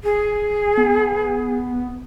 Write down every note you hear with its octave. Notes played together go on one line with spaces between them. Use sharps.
G#4
B3